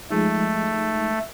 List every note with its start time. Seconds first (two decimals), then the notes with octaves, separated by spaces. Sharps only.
0.10 F3 G#3 A3 D#4